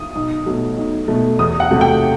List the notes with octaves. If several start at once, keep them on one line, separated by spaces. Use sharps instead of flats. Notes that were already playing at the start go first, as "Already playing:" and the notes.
Already playing: D#6
B1
B2 F#3 A3
B1
B2 F#3 A3
E2 D#6
F#5
C3 F#3 A3
G5